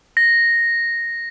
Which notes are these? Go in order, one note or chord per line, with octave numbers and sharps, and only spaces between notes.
A#6